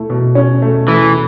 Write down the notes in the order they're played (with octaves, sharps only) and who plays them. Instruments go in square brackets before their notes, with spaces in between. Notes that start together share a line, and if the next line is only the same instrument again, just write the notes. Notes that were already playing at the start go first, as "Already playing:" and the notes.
Already playing: [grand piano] A3 E4
B2
C#4
A3
[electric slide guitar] E3 [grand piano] A3